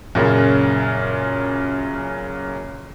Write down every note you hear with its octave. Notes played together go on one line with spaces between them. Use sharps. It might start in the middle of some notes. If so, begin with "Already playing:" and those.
F#2 A#2 C#3